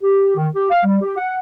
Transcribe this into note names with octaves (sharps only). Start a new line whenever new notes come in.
G4
D#3
G4
F5
G3
G4
F#5